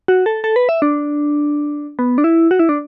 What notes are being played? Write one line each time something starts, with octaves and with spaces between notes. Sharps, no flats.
F#4
A4
A4
B4
E5
D4
B3
D4
E4
F#4
E4
D4